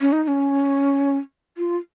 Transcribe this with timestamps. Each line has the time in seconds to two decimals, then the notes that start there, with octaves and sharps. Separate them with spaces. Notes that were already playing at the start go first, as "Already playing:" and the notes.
0.01 C#4
0.12 D#4
0.24 D#4
0.28 C#4
1.58 F4